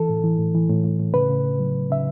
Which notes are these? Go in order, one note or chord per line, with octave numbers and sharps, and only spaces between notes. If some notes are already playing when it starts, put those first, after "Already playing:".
Already playing: E3 A4
A2
E3
A2
E3
A2
A2
A2
C#3 B4
C#3
C#3
F#3
C#3
C#3 E5